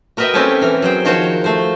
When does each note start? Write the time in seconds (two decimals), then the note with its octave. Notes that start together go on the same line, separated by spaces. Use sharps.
0.17 F#4 A#4 B4 D#5 E5 G5
0.34 A3 C4 C#4 E4 G4 A4
0.61 E3 A#4
0.82 F#3 G#4 C5 G5
1.05 D#3 F3 F#4 A#4 C5 C#5
1.44 A3 C5